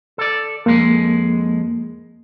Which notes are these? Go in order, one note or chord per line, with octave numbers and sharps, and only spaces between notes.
A4 D5
F2 G#3 A#3